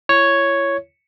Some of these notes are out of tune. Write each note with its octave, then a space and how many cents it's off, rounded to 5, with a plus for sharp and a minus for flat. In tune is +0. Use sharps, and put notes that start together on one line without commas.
E4 +35 C#5 +0